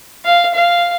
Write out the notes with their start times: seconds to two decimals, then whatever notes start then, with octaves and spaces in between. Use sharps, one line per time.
0.25 F5
0.54 F5